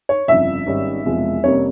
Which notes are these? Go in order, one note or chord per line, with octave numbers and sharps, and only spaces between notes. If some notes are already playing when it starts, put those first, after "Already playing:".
C#5
G1 F2 C#3 F3 E5
G#1 G#2 G3 C#4
E1 E2 C3 F3 G#3
F2 C3 G3 A#3 C#4 C#5